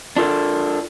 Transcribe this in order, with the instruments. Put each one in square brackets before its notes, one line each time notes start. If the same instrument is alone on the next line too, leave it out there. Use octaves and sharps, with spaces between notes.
[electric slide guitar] D4 F4 A4 A#4